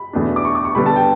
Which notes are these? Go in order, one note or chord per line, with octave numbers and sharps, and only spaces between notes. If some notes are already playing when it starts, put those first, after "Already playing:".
Already playing: B5
E2 B2 A3 D4
D6
C#6
D6
C#6
D3 G3 B3 B5
A5
G5